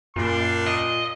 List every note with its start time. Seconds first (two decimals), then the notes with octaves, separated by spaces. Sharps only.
0.16 F#2 A#2 G3 D4 C6
0.67 D#5